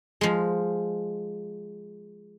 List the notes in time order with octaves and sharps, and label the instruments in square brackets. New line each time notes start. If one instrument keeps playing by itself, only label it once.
[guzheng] F3 G#3